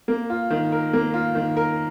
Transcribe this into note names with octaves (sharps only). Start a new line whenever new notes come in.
A#3
F4
D#3
A#4
A#3
F4
D#3
A#4